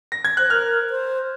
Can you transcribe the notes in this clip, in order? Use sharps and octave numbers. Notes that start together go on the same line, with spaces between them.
A#6
G#6
C5 F#6
A#4 F6
C5